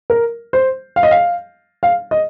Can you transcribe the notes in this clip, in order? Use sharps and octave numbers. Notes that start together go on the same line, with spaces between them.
A#4
C5
F5
D#5
F5
F5
D#5